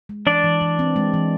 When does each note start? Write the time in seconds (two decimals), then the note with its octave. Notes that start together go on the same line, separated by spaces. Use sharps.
0.09 G#3
0.26 E3 D4 D5
0.44 E3
0.61 E3
0.79 C4
0.96 G#3
1.14 E3